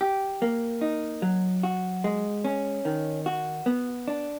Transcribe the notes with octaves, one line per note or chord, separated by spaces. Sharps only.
G4
A#3
D#4
F#3
F#4
G#3
C#4
D#3
F#4
B3
D4